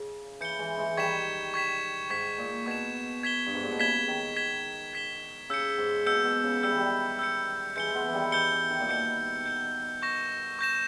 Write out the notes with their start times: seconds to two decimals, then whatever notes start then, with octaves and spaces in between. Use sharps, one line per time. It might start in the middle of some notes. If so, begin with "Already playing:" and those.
Already playing: C#3
0.40 E3 G6 C#7 G7
0.59 E3 G#3
0.78 E3 G#3
0.97 D#3 G3 C#6 G#6 B6 E7
1.54 C#6 G#6 B6 E7
2.10 G#2 C#6 G#6 B6 E7
2.38 A#2
2.66 B2 C#6 G#6 B6 E7
3.23 G#6 B6 E7 G7
3.46 G2
3.55 G#2
3.63 A#2
3.71 B2
3.79 C#3 G#6 B6 E7 G7
4.08 D#3
4.36 G#6 B6 E7 G7
4.93 G#6 B6 E7 G7
5.49 C#3 E6 G6 C#7
5.78 G#2
6.06 B2 E6 G6 C#7
6.25 B2
6.44 C#3
6.63 G3 E6 G6 C#7
6.71 E3
6.77 D#3 G3
7.19 E6 G6 C#7
7.76 E3 G#3 G6 C#7 G7
7.95 G#3 B3
8.08 E3
8.14 D#3 G3
8.32 E3 G6 C#7 G7
8.52 E3
8.70 D#3
8.80 A#2
8.89 B2 G6 C#7 G7
9.46 G6 C#7 G7
10.02 C#6 G6 A#6 E7
10.59 C#6 G6 A#6 E7